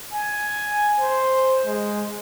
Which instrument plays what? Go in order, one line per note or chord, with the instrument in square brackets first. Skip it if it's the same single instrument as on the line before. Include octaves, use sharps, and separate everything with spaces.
[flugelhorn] G#5
C5
G#3